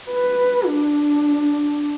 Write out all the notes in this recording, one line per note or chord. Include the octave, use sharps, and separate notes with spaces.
B4
D4